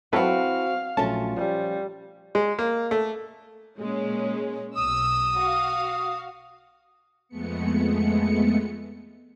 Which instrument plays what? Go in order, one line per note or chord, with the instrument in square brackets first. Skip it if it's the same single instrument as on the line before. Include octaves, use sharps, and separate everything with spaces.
[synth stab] F#3 A4 B4 [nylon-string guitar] C4 F#4 [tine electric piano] E4 [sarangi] F5
[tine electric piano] A#1 F#3 A3 [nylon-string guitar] C#4 F4 [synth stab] A5
[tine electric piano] F3 [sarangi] G3
[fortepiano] G#3
A#3
A3
[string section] A#2 G#3 C#4
[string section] B1 E6 [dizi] D#6
[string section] F#4 F5
[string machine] F2 G#3 A3 B3 C#7